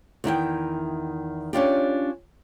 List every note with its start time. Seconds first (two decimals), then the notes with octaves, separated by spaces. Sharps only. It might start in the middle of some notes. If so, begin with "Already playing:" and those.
0.24 E2 D#3 E4 G5
1.53 C#4 D4 F4 G4